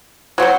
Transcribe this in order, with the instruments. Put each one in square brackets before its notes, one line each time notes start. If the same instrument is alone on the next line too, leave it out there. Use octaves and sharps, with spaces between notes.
[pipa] F#3 C4 F#4 C5